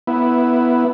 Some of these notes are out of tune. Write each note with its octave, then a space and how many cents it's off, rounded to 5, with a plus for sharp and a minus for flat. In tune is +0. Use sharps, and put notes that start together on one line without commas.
B3 +0 E4 +0